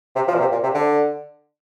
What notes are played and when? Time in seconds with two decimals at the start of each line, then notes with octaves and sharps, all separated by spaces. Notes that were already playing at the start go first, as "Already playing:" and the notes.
0.15 C3
0.27 F3
0.34 A#2
0.40 C3
0.52 A#2
0.63 C3
0.74 D3